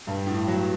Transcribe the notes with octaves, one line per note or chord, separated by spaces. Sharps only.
G2
A2
F#3